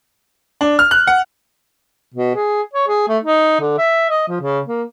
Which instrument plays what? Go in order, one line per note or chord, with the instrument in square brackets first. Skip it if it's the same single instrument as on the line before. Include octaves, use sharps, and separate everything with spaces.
[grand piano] D4
F6
F#6
F#5
[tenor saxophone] B2
G#4
C#5
G#4
A3
D#4
D3
E5
D#5
F3
C#3
A#3